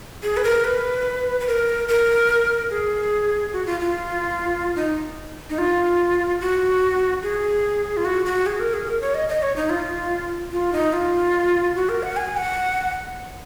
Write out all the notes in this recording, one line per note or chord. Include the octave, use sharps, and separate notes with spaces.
G#4
B4
A#4
B4
B4
A#4
A#4
G#4
F#4
F4
F4
D#4
D#4
F4
F#4
G#4
F4
F#4
F#4
G#4
A#4
G#4
A#4
C#5
D#5
D#5
C#5
D#4
F4
F4
D#4
F4
F#4
A#4
F#5
G#5
F#5